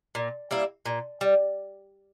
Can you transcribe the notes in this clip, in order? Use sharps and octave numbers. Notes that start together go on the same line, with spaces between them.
A#2
G3 A#3 E4
A#2
G3